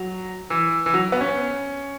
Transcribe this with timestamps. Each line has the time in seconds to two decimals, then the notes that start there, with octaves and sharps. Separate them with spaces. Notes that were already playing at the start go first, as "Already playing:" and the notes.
Already playing: F#3
0.50 E3
0.86 E3
0.94 F#3
1.12 B3
1.21 C#4